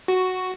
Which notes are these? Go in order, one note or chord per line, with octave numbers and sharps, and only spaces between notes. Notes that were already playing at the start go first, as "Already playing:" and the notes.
F#4